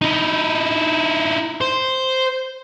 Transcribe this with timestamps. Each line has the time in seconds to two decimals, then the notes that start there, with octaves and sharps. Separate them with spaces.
0.01 D#4 E4
1.61 C5